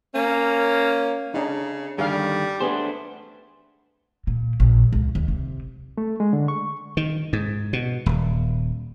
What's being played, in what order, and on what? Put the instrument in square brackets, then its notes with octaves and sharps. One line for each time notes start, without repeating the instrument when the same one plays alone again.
[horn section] A#3 C#4
[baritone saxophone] C#3 [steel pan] D4 D#4
[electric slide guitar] G2 D3 D#3 [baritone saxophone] G3 [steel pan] G#4 F5
[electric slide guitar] A3 D4 C5 [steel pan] B3 G#4
[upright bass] A#2
A#1
C#2
D#2
C3
[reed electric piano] A3
G#3
D3
C#6
[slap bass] D#3
G#2
B2
D#1